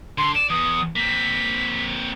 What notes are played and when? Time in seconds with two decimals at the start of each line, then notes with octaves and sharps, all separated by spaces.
0.18 D3 C6
0.35 D5 E7
0.50 E2 D#6
0.96 A#3 C4 B6